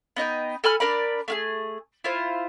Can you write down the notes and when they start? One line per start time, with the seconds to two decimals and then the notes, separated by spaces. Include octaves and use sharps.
0.16 B3 D#4 D#5 G5
0.64 A4 G#5 B5 F6
0.80 D4 A#4 D5 B5
1.28 A3 F4 G#4
2.04 E4 F4 C5